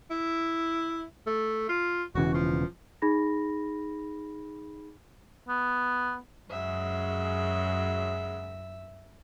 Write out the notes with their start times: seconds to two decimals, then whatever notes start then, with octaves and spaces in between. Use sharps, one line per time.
0.11 E4
1.27 A3
1.69 F4
2.15 E1 C#3 E3 F#4
2.35 F3
3.02 D#4 G#4 B5 A#6
5.49 B3
6.51 F#2 C#3 F#3 G#3 E5